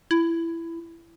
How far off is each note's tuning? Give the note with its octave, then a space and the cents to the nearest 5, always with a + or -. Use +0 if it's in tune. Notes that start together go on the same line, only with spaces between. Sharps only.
E4 +15